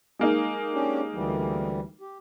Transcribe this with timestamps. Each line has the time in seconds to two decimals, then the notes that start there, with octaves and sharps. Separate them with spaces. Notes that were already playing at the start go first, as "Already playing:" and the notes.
0.19 G#3 A#3 D#4
0.74 C#4 D4 G4
1.13 D2 E3 G3
2.01 G4